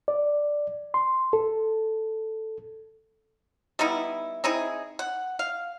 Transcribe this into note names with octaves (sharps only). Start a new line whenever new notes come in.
D5
C6
A4
G3 B3 D#4 E4
C4 D#4 E4 G#4
F#5
F5